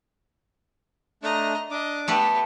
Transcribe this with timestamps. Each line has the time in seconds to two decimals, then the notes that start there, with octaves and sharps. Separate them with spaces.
1.23 A3 D4 D#5 A#5
1.71 D4 D#5 D6
2.08 A3 B3 G4 A4 B4